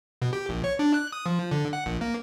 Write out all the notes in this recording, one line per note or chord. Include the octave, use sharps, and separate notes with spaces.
B2
G4
A#1
C#5
D4
F#6
D#6
F3
D3
F#5
A#1
A#3